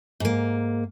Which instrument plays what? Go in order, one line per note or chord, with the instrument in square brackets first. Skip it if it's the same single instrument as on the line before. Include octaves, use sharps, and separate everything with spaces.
[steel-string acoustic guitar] G#2 A#3